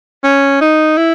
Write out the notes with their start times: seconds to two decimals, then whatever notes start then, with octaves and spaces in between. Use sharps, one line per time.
0.24 C#4
0.61 D#4
0.97 E4